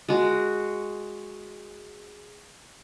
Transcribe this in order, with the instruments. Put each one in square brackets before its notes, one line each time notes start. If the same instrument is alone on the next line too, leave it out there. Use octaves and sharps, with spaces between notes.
[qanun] G#3 F#4